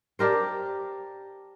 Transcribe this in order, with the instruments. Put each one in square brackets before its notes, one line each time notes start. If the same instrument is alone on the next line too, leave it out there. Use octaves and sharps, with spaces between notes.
[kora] D4 G4 A#4 C5